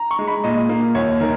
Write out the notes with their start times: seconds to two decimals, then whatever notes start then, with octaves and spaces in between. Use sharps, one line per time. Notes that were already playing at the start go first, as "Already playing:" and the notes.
Already playing: A#5
0.11 C#6
0.19 G#3
0.27 B5
0.44 A#2 D#5
0.69 A#3
0.95 D#2 C#5
1.20 D#3 A#4